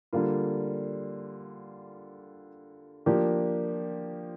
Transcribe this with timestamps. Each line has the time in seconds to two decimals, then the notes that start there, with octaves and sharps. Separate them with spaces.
0.13 D3 G3 A#3 F4
3.06 F3 A#3 D4 G4